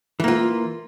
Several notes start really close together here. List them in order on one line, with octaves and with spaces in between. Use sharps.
E3 A#3 F4